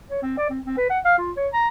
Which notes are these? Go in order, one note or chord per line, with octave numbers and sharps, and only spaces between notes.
C#5
C4
D5
C4
C4
B4
F#5
F5
F4
C#5
A#5